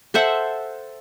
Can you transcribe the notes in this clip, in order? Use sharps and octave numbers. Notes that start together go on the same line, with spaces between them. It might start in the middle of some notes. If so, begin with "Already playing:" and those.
A4 C5 E5 F#5